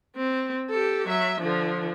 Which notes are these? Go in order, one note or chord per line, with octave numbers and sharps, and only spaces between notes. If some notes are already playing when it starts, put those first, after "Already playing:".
C4
G4 A4
F#3 E5
D3 F3